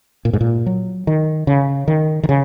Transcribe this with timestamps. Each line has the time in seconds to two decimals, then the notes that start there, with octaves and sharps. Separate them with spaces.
0.25 A#2
0.33 G#2
0.41 A#2
0.66 F#3
1.07 D#3
1.47 C#3
1.88 D#3
2.23 D#3
2.29 C#3